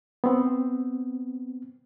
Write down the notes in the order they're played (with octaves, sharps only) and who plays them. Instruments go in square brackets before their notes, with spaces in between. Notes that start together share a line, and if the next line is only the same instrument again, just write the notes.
[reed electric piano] B3 C4